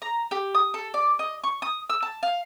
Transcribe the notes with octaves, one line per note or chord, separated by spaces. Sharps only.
A#5
G4
D#6
A4
D5
D#5
C#6
D#6
E6
A5
F5